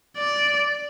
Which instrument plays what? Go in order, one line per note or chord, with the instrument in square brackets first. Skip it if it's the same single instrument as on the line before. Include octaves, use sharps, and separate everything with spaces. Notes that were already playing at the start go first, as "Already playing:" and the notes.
[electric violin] D5